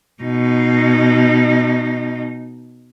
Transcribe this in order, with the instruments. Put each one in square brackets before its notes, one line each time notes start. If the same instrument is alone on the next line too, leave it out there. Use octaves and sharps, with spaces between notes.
[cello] B2 D#4